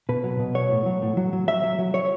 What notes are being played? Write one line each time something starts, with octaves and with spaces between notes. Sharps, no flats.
B2 B4
F#3
B2
F#3 C#5
A2
F#3
A2
F#3
F#3
F#3 E5
F#3
F#3
F#3 C#5